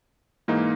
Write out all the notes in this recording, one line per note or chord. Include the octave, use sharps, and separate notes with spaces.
G#2 E3 A#3 D#4